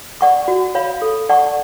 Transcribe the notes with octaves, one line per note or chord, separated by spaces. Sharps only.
D5 F#5 C#6
F#4
C#5 F5 B5
A4
D5 F#5 A5 C#6